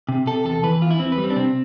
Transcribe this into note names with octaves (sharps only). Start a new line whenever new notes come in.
C3
C3 A4
E2 A4
E3 B4
E2 F4
E4
E2 C4
B4
G3
C4
D4
C3 C4